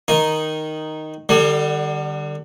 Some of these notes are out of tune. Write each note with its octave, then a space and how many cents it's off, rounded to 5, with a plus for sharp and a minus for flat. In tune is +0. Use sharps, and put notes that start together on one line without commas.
D#3 +0 D#4 +0
D3 +35 G3 +0